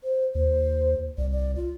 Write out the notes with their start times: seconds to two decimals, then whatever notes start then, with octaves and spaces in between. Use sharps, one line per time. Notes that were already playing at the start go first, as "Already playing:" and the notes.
0.03 C5
0.35 D#2 C5
1.18 C2 D5
1.30 D5
1.56 F4